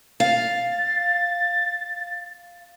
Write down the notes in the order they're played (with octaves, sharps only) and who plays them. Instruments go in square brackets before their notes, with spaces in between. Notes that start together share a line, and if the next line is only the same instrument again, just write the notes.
[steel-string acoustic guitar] F5 [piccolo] A6